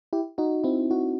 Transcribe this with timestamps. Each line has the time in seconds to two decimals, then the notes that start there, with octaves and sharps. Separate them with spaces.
0.13 E4 G4
0.38 D#4 F#4
0.64 C4 E4
0.91 D#4 F#4